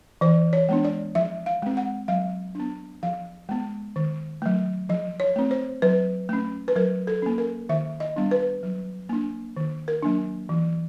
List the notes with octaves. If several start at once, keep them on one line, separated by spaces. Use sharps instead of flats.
E3 C5
C#5
G#3 B3 D4
D5
F3 E5
F5
G#3 C4
F#5
F#3 F5
B3 D4
F3 F5
G#3 B3
D#3
F#3 A3
F3 D#5
C#5
A3 C4
C5
F#3 B4
A3 C#4
B4
F#3 A#4
A4
A#3 C#4
A#4
D#3 E5
D#5
G3 B3 D4
B4
F#3
A#3 D4
D#3
A#4
F#3 A#3 D4
E3